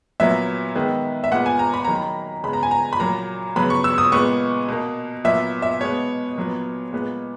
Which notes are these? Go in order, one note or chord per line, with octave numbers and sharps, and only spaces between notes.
A#2 F#3 B3 E5
D#3 G#3 B3
E5
A#2 G#3 B3 F#5
G#5
A#5
B5
D#3 F#3 A#3 A#5
B5
C#3 G#3 B3 B5
A#5
G#5
A#5
B5
A#2 F#3 A#3 A#5
C#3 F#3 B3 B5
C#6
E6
D#6
A#2 G#3 B3 C#6
B2 A#3
A#2 F#3 B3 E5
E5
B2 G#3 B3 C#5
A#2 F#3 B3
A#2 G#3 B3